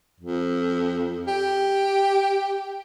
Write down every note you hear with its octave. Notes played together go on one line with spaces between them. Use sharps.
F2
G4